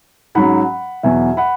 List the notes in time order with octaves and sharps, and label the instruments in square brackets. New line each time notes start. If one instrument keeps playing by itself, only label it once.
[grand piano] G#2 F#3 C#4 F#5 B5
E2 B2 F#3 E5 G#5
F#5 B5